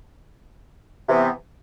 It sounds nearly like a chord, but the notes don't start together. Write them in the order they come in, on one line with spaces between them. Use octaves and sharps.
C3 E3 B3